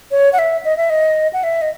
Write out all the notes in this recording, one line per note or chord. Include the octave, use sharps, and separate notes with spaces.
C#5
F#5
E5
D#5
E5
D#5
F#5
E5
D#5